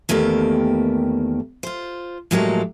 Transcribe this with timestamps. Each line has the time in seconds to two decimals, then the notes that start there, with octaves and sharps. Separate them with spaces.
0.09 E2 D#3 A3 A#3 G4
1.63 F4 C5
2.31 A2 F3 F#3 G#3 A#3 G4